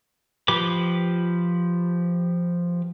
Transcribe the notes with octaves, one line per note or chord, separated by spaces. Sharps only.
F3 G4 B4 D6